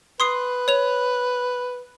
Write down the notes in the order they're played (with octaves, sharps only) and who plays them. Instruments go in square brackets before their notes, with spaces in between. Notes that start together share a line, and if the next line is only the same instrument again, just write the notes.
[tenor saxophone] B4 [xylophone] C6 D#6 C7
[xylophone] C#5 F7